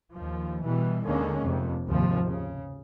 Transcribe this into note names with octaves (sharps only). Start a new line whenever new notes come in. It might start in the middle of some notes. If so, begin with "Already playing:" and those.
D#2 F3
B2 E3 G3
D#2 D3 D#3 G#3 A#3 C#4
F1 F2 C3
D#2 G#2 C3 F3
C#3